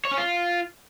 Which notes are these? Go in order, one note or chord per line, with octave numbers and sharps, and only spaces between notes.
C#5
C#4
F4